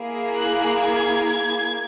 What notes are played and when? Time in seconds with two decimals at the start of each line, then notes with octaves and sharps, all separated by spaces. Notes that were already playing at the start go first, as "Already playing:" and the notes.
Already playing: A#3 E4 G#4
0.36 F#6
0.79 G#6